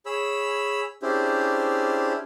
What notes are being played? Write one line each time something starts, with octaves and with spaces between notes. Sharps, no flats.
G#4 C#5 B5 E6
C#4 D4 E4 G4 G#4 C5